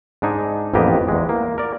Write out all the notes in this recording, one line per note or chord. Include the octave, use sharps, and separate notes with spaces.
G#2 D4 D#4 G#5
A1 F2 A#3 B3 G4 D#5
E2 G#3
A#3
A#4 D5